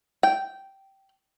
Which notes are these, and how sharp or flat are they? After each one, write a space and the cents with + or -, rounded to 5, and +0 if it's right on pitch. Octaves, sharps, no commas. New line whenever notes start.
G5 -10